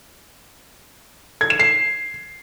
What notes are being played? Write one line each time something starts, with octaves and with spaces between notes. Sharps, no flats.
G#6
E7
C7